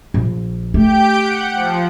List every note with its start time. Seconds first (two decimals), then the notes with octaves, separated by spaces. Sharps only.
0.14 A#1
0.74 A3 G4 G6 D7
1.22 F#5
1.54 F3